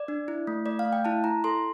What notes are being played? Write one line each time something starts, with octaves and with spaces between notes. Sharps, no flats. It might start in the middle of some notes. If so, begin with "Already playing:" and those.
Already playing: D5
D4
E4
A3
A3 D5
F5
A3
G5
E4 A5
E4 A#5
A4 C6